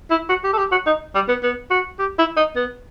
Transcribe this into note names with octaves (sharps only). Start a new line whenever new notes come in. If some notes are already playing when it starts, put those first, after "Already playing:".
E4
F#4
G4
A4
G4
F#4
D#4
G3
B3
B3
F#4
G4
E4
D#4
B3